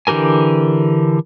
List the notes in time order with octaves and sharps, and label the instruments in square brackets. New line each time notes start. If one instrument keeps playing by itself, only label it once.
[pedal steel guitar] D3 E3 G4 A#4 G#5